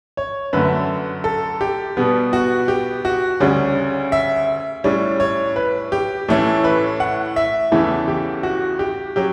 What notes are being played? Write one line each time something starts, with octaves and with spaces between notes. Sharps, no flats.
C#5
F#2 D3 A3 B4
A4
G4
B2 G3 B3
F#4
G4
F#4
D2 C#3 G3 C#4
E5
A2 G3 C#4
C#5
B4
G4
A2 E3 A3 C#4
B4
F#5
E5
E2 C#3 E3 A3
G4
F#4
G4
F#3 C#4 G4